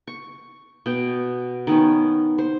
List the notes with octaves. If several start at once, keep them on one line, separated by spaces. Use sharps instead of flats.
C#6
B2 G5
D#3 B3 C#4
C5